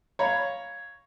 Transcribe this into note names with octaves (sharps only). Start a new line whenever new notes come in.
C#5 F5 A#5 B5